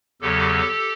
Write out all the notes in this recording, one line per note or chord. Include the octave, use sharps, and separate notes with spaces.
E2 C#3 F#3 G4 A4